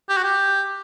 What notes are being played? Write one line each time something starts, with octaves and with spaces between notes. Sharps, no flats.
G4
F#4
G4